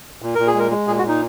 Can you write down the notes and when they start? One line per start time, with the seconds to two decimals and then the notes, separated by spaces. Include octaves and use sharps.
0.22 A#2
0.35 A#2 A#4
0.47 G#4
0.55 G#3 A#4
0.71 G#3
0.87 A#2 G#4
0.98 F#4
1.03 A#2
1.08 D#4